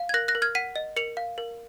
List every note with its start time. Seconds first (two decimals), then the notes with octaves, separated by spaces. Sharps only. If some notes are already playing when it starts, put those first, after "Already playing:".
Already playing: F5
0.09 G#6
0.14 A#4 F#6 A#6
0.28 F#6 A#6
0.35 A#4
0.42 F6 G#6
0.55 F#5 B6 D#7
0.76 D#5
0.96 A#4 C#7 F7
1.17 F5
1.38 A#4